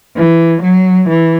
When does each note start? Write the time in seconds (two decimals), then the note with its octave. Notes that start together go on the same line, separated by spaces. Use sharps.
0.17 E3
0.62 F#3
1.09 E3